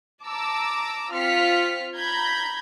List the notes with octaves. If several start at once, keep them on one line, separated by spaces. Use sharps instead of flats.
A5 A#5 D6 E6
C4 F4 F6 B6 C#7
A#5 B5 G6 G#6 B6